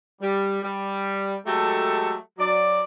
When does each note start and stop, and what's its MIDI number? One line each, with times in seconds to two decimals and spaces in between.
0.20 0.60 55
0.62 1.36 55
1.45 2.13 54
1.45 2.13 56
1.45 2.13 57
1.45 2.13 67
1.45 2.13 69
2.38 2.81 54
2.38 2.81 74